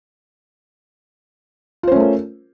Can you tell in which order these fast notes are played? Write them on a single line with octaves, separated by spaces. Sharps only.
F4 C5 C#4 A3 A#4